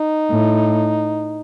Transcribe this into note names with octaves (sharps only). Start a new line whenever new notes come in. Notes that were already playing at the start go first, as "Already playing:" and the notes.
Already playing: D#4
A2